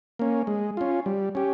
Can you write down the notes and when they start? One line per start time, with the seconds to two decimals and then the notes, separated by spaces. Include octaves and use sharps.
0.19 A#3 C#4
0.47 G#3
0.77 C#4 F4
1.06 G3
1.35 C#4 G4